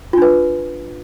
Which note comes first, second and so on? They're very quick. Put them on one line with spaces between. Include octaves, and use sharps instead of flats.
F4 D4 B4